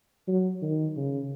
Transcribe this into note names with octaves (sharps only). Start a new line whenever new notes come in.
F#3
D#3
C#3